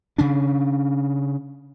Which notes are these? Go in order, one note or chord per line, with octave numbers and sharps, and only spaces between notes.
C#3 C#4 D4